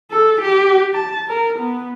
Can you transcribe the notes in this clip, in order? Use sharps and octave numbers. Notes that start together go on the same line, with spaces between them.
A4
G4
A5
A#4
B3